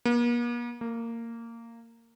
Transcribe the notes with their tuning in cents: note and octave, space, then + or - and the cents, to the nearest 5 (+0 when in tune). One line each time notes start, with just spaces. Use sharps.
A#3 +45
A#3 -15